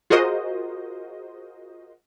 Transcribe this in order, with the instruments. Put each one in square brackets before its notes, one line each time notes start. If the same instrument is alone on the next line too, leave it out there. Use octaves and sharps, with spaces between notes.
[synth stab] F4 F#4 G#4 A#4 C5 D#5